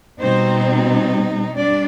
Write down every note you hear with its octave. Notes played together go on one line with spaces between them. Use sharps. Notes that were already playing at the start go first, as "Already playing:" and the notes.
B2 G3 C4 D#4 C5
G3 D4 D5